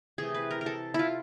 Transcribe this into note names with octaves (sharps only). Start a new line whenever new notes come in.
C3 E3 A3 G#4
B4
A#4
A#4
A4
E4 F4